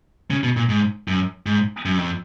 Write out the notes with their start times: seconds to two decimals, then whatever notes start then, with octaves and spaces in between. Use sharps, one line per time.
0.30 C#3
0.43 B2
0.57 A#2
0.69 G#2
1.08 F#2
1.46 G#2
1.85 F#2
1.98 F2